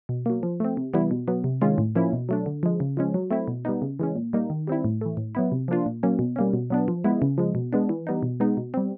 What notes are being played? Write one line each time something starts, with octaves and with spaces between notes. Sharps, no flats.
B2
F#3 A#3
F3
A3 C4
C3
E3 G3 B3 E4
B2
F#3 B3
C3
D#3 G#3 C#4 F4
A2
F3 A#3 C#4 E4
B2
F#3 A3 D4
D3
F3 G#3
C#3
F3 G#3 C#4
F#3
A3 C4 E4
B2
G3 B3 D#4
C#3
E3 G#3 C#4
A#2
G3 A#3 D#4
D#3
G3 C4 E4
A2
E3 A3
A2
F#3 B3 E4
C3
F3 A#3 D4 F4
A#2
F#3 A#3 C#4
B2
G3 A#3 C#4
B2
F#3 B3 D4
F3
G#3 B3 E4
C#3
F3 G#3
B2
G#3 B3 D4
E3
G3 B3 D#4
B2
G#3 B3 D#4
B2
G3 C4